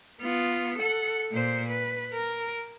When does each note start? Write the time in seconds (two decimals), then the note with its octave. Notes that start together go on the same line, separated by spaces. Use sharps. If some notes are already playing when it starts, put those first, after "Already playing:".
0.21 B3 F4
0.78 A4 F#5
1.32 A#2 C5
1.69 B4
2.13 A#4